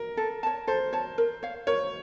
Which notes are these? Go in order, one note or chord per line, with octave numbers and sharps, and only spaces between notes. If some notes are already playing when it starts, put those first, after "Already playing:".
Already playing: A#4
A4
C#5 A5
A4 C5
C#5 A5
A#4
C#5 F5
A#4 C#5